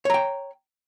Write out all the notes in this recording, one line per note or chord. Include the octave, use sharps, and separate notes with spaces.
C#5 G5 A#5